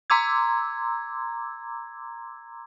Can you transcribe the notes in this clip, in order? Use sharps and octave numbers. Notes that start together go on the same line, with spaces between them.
A#5 C6 D6 E6 G#6